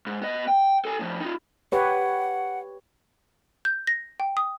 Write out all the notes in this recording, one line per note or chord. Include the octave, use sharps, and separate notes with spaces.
G#2
B3 D#5
G5
A4 G#5
A2 F3
D#4 F4
G4 B4 C#5 F#5
G6
A#6
G5
D#6